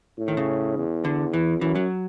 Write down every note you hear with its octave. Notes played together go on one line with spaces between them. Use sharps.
A2
D#3
C#3
E2
D3
E3
F#2 E3
F#3